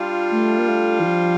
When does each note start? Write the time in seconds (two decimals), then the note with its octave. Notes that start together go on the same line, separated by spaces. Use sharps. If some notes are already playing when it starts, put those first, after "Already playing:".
Already playing: G3 D4 F4
0.31 A3
0.58 A#3
0.68 A3
1.00 E3
1.05 F3